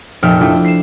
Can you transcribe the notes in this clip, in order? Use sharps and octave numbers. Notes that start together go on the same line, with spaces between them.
F1 A#2 E5 G5 F6
A3 D4 E4 F4 G5
C7 E7